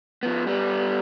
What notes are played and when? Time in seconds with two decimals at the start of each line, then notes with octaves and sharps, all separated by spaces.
0.23 F3 B3
0.47 G3 B3